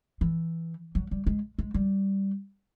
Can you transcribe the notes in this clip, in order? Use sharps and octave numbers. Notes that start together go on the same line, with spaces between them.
E3
F#3
G3
G#3
G#3
G3